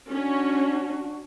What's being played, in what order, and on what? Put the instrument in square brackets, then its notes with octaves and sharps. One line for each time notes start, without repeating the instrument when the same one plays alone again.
[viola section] C#4 [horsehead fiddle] D4 F#4